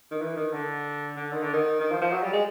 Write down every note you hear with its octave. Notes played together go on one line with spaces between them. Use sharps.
D#3
E3
D#3
D3
D3
D#3
D3
D#3
D#3
F3
F3
F#3
G3
G#3